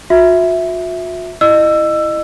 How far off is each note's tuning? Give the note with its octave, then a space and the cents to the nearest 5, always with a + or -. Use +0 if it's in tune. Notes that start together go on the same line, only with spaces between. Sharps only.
F#4 -45 E5 +0
E4 +0 D#5 -25 E6 +15